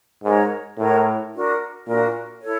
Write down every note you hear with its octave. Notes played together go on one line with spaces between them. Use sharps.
G#2 F#4 A#4 C#5
A2 F#4 A#4 C#5
D4 F#4 A#4
A#2 D4 F#4 A#4
E4 A4 C#5